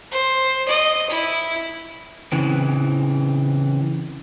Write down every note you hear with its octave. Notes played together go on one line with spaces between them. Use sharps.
C5
D#5
E4
C#3 E3 C4